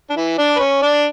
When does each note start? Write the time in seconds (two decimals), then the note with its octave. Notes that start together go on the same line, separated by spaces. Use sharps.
0.10 D4
0.16 E3 E4
0.38 D4 D5
0.56 B4
0.59 C#4 C#5
0.82 D4 D5